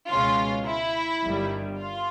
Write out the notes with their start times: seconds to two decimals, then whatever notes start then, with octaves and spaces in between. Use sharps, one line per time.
0.11 C#2 B2 G#3 C#4 F4
0.67 E4
1.24 G1 G2 D#3 G3
1.79 F4